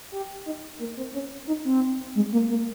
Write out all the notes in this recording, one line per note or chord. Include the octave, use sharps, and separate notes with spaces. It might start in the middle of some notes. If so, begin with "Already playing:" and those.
G4
D#4
A#3
C4
C#4
D#4
C4
G#3
A#3
A#3